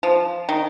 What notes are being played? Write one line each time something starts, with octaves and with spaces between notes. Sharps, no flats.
F3
D#3